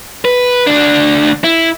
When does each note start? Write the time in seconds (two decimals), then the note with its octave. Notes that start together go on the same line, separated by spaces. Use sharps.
0.25 B4
0.67 D2 D4
1.44 E4